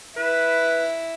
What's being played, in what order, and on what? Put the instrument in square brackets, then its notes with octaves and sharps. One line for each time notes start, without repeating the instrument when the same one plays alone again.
[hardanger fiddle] E4 [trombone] B4